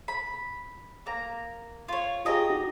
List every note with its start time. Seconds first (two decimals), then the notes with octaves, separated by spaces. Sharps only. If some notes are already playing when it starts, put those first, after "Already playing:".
0.08 B5
1.06 A#3 A#5
1.88 F4 C#5
2.25 F4 G4 G#4 D#5 A#5
2.50 D#4 F#4